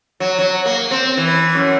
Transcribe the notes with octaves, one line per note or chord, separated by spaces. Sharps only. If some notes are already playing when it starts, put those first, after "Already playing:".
F#3
F#3
A#3
C4
E3
F#2